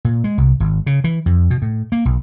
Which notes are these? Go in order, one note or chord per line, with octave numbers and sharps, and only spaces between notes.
A#2
G#3
C2
G#1
C#3
E3
F2
B2
A2
A#3
B1